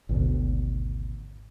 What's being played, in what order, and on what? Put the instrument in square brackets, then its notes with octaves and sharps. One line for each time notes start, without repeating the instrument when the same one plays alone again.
[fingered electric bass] G#1 D2 B2